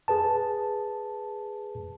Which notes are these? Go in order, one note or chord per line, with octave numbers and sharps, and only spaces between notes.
G#4 B4 A5